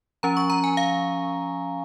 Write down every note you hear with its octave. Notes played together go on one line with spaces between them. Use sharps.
F3 C#4 A#5
C#6
A#5
G#5
F5